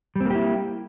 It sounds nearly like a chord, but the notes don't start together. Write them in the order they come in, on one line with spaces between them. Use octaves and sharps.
G3 C4 A#3 G4 E4